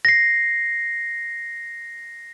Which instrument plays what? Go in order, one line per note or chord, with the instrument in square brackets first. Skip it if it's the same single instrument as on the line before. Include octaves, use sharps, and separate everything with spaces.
[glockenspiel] A#6 C7